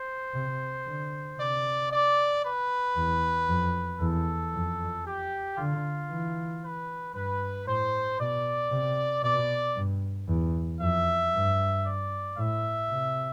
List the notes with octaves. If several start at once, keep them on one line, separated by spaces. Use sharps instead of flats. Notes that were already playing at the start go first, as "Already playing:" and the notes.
Already playing: C5
C3
D3
C3 D5
D5
B4
E2
F2
E2 A4
F2
G4
D3 F4
E3
B4
G2 B4
A2 C5
B2 D5
C3
B2 D5
G2
E2
F2 E5
G2
D5
A2 E5
C3